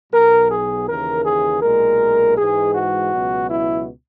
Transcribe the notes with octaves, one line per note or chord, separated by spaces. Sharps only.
B1 B2 F#3 A#4
G#4
D#2 C#3 E3 A#4
G#4
B1 A#2 G#3 A#4
G#2 E3 G#3 G#4
F#4
C#2 B2 F#3
E4